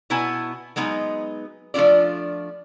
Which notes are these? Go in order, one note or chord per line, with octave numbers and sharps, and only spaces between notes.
B2 B3 E4 G#5 A5
F#3 G#3 B3 D#4
F3 A3 D4 F4 D5